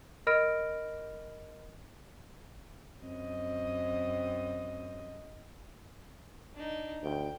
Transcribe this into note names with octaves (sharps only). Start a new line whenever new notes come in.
A#4 D#5 B5 F6 A#6 D7
F#2 C4 D#5
D4 D#4
D2 G5